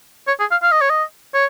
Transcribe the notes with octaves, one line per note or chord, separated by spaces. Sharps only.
C#5
G#4
F5
F5
D#5
C#5
D#5
C#5